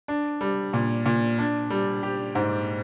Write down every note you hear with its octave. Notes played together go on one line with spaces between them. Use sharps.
D4
G3
A#2
A#2
D4
G3
G4
G#2